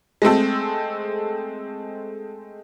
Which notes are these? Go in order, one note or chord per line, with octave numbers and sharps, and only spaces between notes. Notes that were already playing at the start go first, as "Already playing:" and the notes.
G#3 A3 C4 A4